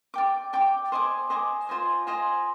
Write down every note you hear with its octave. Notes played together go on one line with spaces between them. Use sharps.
D5 G5 D6
D5 G5 D6
C5 D#5 G#5 D6
C5 D#5 G#5 D6
F4 C5 D#5 G#5
F4 C5 D#5 G#5